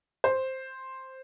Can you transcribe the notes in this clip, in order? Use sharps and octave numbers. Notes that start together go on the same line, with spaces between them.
C5